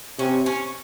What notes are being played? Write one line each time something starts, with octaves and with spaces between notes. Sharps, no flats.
C3 C#4
C#4